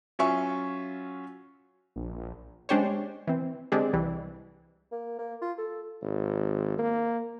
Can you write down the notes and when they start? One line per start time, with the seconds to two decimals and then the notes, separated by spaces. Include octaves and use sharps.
0.19 F#3 C#4 F4 E5 G#5 C#6
1.96 A#1
2.69 G#3 C#4 D4 G4 C5 C#5
3.27 E3 C4
3.72 D3 G#3 C4 D4 G4 G#4
3.93 C2 E3 G3
4.92 A#3
5.19 A#3
5.42 F4
5.58 A4
6.02 G#1
6.79 A#3